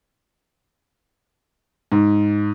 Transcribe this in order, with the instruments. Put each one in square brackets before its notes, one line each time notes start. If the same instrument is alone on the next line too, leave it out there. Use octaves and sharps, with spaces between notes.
[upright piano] G#2